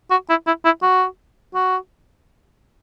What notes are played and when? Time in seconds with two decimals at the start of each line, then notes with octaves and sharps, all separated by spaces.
0.10 F#4
0.29 E4
0.46 E4
0.65 E4
0.82 F#4
1.54 F#4